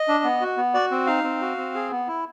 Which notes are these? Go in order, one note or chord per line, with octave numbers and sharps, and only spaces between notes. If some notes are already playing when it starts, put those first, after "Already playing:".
Already playing: D#5
D4
B3
F#4
B3
F#4 D5
C4
D#4 F5
C4
F#4
C4
G#4
B3
E4